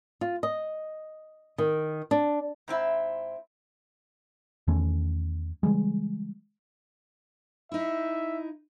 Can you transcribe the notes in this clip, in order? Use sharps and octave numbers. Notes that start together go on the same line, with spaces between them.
F4
D#5
D#3
D4
G#2 C4 E4
E2 D#3 A3 C#4
C#3 E3 G3 G#3
D#4 E4 E5